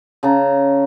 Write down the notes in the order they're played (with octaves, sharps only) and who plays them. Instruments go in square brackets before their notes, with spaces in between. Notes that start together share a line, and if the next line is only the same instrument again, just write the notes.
[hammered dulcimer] C#3 A5 A#5